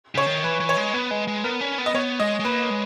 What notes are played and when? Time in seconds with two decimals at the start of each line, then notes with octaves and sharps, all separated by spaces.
0.15 C#3 C#5
0.27 D#3
0.43 E3 B4
0.60 E3
0.69 C#5
0.77 G#3
0.94 B3 B4
1.11 G#3
1.27 G#3
1.44 B3 A#4
1.61 C#4
1.78 B3
1.86 D#5
1.95 B3 C#5
2.20 G#3 D#5
2.40 G#3
2.45 A#3 B4
2.70 G#3